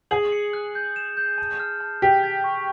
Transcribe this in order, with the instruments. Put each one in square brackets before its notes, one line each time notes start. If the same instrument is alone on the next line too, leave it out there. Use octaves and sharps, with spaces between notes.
[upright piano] G#4 [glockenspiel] F#7
[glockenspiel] C#7
F#6
G6
E7
G6
A5
F6
A5
[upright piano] G4 [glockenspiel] B6
[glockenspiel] G#6
C#6